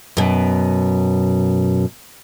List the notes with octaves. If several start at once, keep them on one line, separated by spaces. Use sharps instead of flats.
F#2 B2